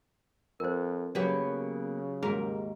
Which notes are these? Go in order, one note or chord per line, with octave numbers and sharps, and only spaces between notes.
F2 A#4 C5
C#3 F#3 A#3 B3 G4 B4 C#5 D5
D#2 G#2 F#4 G#4 A#4